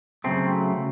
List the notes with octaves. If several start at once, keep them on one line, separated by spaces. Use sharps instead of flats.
C#3 F#3 A3 C4